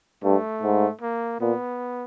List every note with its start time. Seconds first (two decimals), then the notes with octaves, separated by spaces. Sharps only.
0.24 G2 A3
0.63 G#2
1.01 A#3
1.41 A#2 B3